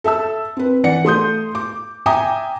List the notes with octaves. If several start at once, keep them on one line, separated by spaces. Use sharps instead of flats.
A4 E5 A5 E6
C4 B4
E3 D5 F#5 C#7
A3 C6 D#6 G6
D6
E5 G5 G#5 A#5 D6 D#6